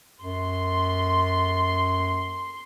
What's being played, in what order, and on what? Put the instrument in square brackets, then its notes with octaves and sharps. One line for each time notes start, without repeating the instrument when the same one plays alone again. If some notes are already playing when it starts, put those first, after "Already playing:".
[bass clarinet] F#2 [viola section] C6